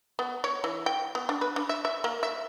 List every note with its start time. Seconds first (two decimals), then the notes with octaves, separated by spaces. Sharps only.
0.19 B3
0.44 C#5
0.64 E3
0.86 G5
1.15 B3
1.29 D4
1.41 B4
1.56 D4
1.69 E5
1.85 E5
2.04 A#3
2.23 E5